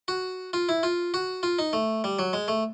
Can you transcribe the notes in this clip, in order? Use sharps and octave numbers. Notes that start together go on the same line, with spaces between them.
F#4
F4
E4
F4
F#4
F4
D#4
A3
G3
F#3
G#3
A3